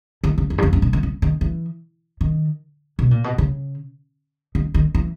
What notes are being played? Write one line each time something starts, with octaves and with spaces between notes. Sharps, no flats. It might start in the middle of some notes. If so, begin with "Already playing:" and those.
D#3
C#3
E2
G2
E2
G2
A#2
D#3
C#3
D#3
E3
D#3
B2
A#2
B2
C#3
D#3
D#3
E3